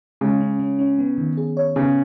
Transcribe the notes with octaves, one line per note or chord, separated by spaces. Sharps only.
C#3 G#3
C#4
C#4
C#4
B3
D#3
G#4
C#5
C#3 B3